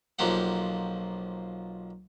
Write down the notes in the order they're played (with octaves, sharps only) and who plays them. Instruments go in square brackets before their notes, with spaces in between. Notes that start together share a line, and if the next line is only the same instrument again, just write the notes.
[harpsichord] B1 F3 A#3 G4 F#5